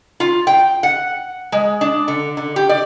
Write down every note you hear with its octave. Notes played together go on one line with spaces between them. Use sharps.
F4
G5
F#5
G#3
D4
D3
D3
G4
D5